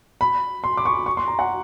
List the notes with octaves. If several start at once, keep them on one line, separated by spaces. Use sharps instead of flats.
B5
C6
D6
C#6
C#6
C6
A#5
F#5